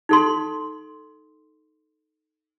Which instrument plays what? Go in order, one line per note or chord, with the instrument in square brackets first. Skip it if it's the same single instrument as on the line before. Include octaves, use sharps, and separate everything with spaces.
[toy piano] D#4 A4 C6